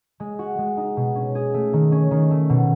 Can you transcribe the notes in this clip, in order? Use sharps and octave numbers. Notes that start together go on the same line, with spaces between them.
G#3
F#4
G#3
D#4
B2
C#4
G#4
A3
D#3
C#4
D#3
A3
B2